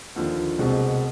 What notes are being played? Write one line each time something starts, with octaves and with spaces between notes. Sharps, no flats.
D#2 D3 F3
C2 B2 G#3 C4